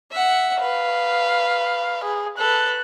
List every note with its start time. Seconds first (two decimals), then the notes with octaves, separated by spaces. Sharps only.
0.11 E5 F#5
0.60 B4 F5
2.05 G#4
2.39 A4 B4 F#6